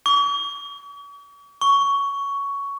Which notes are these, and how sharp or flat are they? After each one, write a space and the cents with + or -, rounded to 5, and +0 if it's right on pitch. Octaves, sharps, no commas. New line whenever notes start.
C#6 +45
C#6 +10